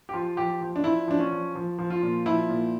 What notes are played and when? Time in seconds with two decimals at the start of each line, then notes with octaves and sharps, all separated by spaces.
0.09 G4
0.13 F3 F4
0.37 F3 G4
0.61 F3
0.76 D4
0.84 F3 E4
1.08 F3 D4
1.19 C#4
1.31 F3
1.55 F3
1.79 F3
1.90 F4
2.02 A#2
2.26 F3 E4
2.49 A#2